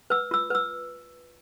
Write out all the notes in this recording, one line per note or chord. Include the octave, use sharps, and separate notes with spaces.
B4 E6
F4 E6
B4 E6